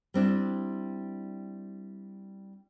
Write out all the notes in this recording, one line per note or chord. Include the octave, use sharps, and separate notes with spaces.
G3 C4 D4 E4